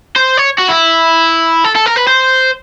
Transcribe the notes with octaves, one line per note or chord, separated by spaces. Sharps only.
C5
C#5
F#4
E4
A4
A4
A#4
B4
C5